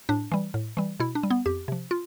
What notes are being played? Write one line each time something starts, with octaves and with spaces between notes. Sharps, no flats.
A2 D4
E3 G3
A2
E3 G3
B2 E4
D4
G3
B3
F2 G4
C3 F3
F4